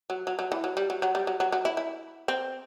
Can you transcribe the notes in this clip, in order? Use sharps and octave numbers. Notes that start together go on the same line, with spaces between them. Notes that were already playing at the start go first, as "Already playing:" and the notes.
F#3
F#3
F#3
E3
F#3
G3
F#3
F#3
G3
F#3
F#3
F#3
E4
E4
C4